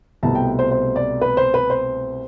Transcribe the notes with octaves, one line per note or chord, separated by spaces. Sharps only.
C2 B2 A3 C4 A5
G5
C5
C5
D5
B4
C5
B4
C5